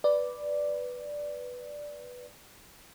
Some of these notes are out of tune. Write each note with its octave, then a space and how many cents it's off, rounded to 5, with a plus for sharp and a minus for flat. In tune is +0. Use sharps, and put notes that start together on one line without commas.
B4 +0 D5 +0